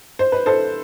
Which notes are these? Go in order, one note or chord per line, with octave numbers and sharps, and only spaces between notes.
C5
B4
A4 C5